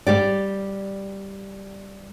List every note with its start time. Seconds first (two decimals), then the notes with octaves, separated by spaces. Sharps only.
0.07 G3 G4 D5